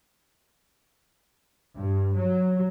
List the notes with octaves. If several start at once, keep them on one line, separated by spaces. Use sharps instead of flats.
G2
F#3